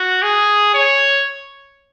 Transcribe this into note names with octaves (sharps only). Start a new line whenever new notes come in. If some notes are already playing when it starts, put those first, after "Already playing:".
Already playing: F#4
G#4
C#5